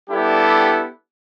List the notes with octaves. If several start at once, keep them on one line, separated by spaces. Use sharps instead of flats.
G3 B3 D4 E4 G4 A4